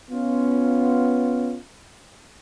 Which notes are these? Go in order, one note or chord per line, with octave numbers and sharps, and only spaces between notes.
B3 C#4 F4